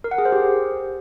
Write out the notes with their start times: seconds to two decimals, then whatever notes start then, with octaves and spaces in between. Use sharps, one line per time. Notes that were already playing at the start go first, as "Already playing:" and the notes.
0.04 A#4
0.11 F#5
0.18 G#4
0.25 C5
0.32 G4